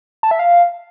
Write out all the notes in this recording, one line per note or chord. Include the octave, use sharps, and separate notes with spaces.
A5
E5
F5